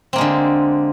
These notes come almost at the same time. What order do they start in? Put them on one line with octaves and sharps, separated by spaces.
C4 A#3 G#3 D3